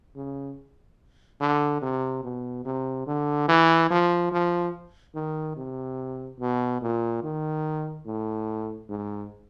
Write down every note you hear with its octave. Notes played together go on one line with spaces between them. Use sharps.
C#3
D3
C3
B2
C3
D3
E3
F3
F3
D#3
C3
B2
A#2
D#3
A2
G#2